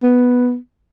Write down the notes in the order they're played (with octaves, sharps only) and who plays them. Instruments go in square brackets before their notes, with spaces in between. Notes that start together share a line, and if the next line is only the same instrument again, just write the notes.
[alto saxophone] B3